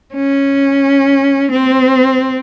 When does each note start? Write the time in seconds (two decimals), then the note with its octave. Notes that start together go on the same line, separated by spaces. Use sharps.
0.14 C#4
1.51 C4